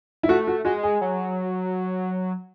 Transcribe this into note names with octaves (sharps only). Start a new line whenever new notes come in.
E4
A3 F#4
F#4
G#3 F#4
G#4
F#3